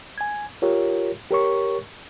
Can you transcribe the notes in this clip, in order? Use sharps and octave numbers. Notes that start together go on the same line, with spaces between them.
G#5 G#6
F4 G4 A#4 C#5
G4 A#4 C#5 C#6